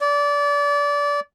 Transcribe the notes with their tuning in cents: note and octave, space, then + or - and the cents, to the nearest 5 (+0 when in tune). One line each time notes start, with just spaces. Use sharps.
D5 -25